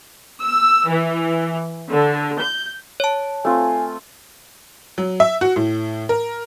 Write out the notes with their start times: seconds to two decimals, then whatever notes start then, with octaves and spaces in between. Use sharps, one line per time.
0.42 E6
0.89 E3
1.91 D3
2.40 G6
3.00 C#5 A5
3.45 A3 C4 F4 G#5
4.98 F#3
5.20 E5
5.41 F#4
5.56 A2
6.09 A#4